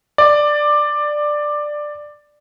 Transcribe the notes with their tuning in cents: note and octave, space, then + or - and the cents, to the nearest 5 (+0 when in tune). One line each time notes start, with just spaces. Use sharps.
D5 +10